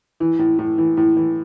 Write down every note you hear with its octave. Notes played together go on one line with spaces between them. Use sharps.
E3
A2
A2
E3
A2
E3